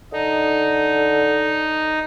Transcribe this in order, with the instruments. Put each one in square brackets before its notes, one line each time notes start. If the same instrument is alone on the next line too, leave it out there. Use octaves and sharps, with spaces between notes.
[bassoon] D3 [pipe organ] D#4